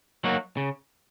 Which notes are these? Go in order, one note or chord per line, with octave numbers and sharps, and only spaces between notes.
F#3 A#3 D#4 F#4
C#3